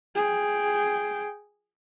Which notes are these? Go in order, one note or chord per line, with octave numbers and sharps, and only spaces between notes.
G#4 G5